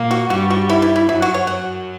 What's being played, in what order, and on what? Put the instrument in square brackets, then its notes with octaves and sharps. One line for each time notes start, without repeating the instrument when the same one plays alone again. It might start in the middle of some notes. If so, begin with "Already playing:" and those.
Already playing: [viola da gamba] A#2 A#3
[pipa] F#4
[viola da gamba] G2 G3 [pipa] F#4
[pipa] F#4
E4
E4
E4
[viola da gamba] F#2 F#3 [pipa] E4
[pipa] F#4
C#5
[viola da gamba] F#2 F#3 [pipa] F#5